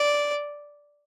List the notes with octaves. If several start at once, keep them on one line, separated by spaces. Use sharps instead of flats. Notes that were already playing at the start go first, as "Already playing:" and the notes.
Already playing: D5